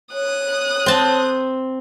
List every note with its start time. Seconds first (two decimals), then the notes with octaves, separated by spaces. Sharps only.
0.13 C#5 D#6 F#6
0.86 C4 A5